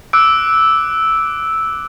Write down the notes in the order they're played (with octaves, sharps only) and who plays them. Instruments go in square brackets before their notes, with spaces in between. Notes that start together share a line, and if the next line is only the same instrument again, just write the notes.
[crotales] D6 E6 F#6 D7